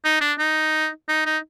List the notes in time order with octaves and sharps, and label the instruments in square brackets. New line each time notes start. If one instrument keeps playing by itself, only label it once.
[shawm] D#4
D4
D#4
D#4
D#4